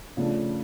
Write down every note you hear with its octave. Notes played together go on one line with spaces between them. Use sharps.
C#3 F3 A3 D4